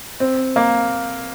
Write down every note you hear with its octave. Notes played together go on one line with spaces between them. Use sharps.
C4
A#3